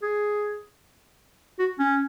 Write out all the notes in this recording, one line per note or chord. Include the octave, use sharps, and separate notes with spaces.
G#4
F#4
C#4